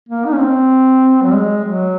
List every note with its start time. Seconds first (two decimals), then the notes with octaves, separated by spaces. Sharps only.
0.09 A#3
0.26 D#4
0.33 C#4
0.40 C4
1.23 F#3
1.33 G#3
1.65 F#3